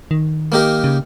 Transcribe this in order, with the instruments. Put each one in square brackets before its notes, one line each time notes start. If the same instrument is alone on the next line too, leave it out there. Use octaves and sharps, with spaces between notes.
[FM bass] D#3
[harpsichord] A#3 D#4 G4 A#4
[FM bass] C#3